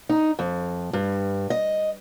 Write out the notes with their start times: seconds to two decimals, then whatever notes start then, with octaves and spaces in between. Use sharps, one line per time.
0.09 D#4
0.39 F2
0.93 G2
1.50 D#5